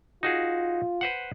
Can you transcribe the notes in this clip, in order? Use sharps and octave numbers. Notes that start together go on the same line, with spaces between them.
D#4 F4 F#4 G#4
B4 C5 F#5